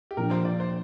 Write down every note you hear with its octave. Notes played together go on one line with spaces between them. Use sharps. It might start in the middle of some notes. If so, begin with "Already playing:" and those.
G4
A#2 F3 D4 A#4
C5
D5
C5